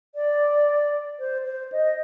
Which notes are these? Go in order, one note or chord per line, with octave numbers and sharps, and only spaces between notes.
D5
C5
C5
D#5